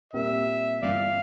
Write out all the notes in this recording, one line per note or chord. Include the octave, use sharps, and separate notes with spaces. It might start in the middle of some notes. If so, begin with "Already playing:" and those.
A#2 G3 C4 G4 A#4 E5
G1 G2 E3 D5 F5